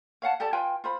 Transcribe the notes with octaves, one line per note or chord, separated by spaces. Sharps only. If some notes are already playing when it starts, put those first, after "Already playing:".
C#5 F5 F#5 A5
G4 A4 D5 A5
F4 B4 G5 G#5
F4 C5 B5